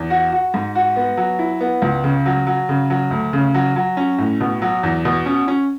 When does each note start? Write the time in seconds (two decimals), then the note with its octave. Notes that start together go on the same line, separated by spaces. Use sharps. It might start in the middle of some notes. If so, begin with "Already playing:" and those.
Already playing: E2
0.10 F#4
0.32 F#4
0.54 G#2
0.75 F#4
0.96 B3
1.17 F#3
1.39 E4
1.61 B3
1.82 C#2
2.04 C#3
2.26 F#3
2.47 F#3
2.69 C#3
2.90 F#3
3.11 D2
3.33 C#3
3.54 F#3
3.76 F#3
3.97 C#4
4.18 A2
4.41 B2
4.62 F#3
4.83 E2
5.05 B2
5.26 C#4
5.48 C#4